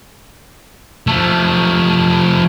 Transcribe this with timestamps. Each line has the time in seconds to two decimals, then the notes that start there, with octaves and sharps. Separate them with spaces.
1.07 F3 A3